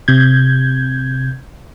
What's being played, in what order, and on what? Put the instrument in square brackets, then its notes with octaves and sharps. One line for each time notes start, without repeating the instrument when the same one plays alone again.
[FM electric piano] C3 G6 G#6